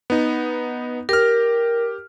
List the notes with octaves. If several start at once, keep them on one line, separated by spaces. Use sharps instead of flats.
B3 D#4
G4 A#4 F6